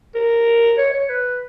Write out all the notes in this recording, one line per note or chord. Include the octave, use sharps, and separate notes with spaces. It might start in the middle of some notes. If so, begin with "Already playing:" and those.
A#4
C#5
C#5
B4